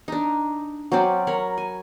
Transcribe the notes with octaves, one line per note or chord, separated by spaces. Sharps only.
D4 D#4
F#3 C4 C#4 D5
A#4 C#5 B5
G#5